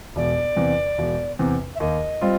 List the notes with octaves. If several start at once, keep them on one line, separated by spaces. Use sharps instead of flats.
E1 D5
E2 C3
E1
E2 C3
E5
D#2 D#5
G3 C4 F4